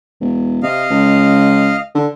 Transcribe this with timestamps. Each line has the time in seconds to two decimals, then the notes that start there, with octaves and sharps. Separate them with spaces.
0.20 E1
0.63 C3 D#5 F5
0.90 C#2
1.95 D3